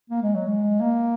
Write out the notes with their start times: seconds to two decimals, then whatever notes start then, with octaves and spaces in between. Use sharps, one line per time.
0.10 A#3
0.22 G#3
0.35 F#3
0.47 G#3
0.80 A#3